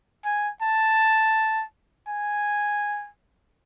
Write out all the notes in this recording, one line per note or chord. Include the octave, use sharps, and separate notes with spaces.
G#5
A5
G#5